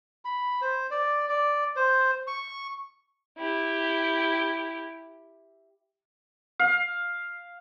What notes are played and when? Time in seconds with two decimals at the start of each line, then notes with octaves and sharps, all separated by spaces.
0.25 B5
0.61 C5
0.91 D5
1.29 D5
1.76 C5
2.28 C#6
3.38 E4 G4
6.59 F5